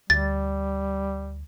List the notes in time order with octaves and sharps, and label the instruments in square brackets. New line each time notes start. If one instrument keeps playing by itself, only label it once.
[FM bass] D2 [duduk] G3 [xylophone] A6